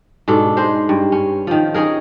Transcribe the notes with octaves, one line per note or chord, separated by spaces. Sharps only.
G#2 B2 D4 A4
G#3 C5
G2
C#4
D#3 F3
C#4 D#4 G#4 A#4